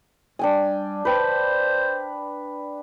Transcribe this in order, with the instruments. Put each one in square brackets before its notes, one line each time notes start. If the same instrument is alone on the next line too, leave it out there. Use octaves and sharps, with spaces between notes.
[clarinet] G3 [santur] D4 G5 G#5
[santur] B4 G5 [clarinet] C5